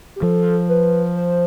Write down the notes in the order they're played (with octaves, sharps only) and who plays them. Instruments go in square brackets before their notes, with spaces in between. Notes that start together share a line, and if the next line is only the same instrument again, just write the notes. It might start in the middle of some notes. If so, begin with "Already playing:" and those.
[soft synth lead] G4
[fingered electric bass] F3 [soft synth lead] A4
[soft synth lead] B4
C5